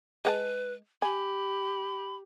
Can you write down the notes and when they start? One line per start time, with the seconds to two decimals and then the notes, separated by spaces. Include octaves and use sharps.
0.25 G#3 B4 F#5 A5
1.02 G4 G#5 B5